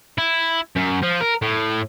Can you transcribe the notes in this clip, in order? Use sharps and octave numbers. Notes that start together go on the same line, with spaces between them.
E4
F#2
F3
A#4
A2